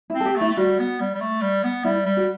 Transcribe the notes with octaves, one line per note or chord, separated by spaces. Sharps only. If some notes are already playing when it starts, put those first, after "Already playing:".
E4
C4
A4
G4
A3 E4
A3
G3 F#4
B3
G3
G3
A3
G3
B3
G3 E4
G3
F#4